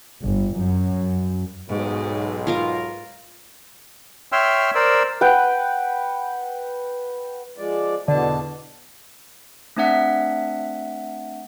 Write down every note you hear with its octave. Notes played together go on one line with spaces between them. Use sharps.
G1
F#2
B1 G#2
F4 A#4 F5
C#5 E5 G5 C6 E6 F6
A#4 C5 D5 E6
B4 F#5 G5
F3 G#3 D5
E2 B2 D3 A5
A3 C4 D4 E5 F#5 B6